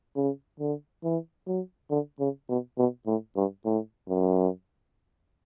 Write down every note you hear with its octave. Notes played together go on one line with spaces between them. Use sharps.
C#3
D3
E3
F#3
D3
C#3
B2
B2
A2
G2
A2
F#2